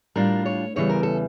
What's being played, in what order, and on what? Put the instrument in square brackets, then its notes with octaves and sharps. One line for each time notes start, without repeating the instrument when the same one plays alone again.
[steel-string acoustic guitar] A2 G3 D4 F4 A#4
C#5
E2 C#3 E3 G3 C#5
A#4
A4